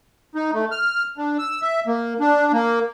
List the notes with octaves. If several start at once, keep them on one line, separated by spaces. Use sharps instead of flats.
D#4
A3
F6
D4
E6
E5
A#3
D4
A#3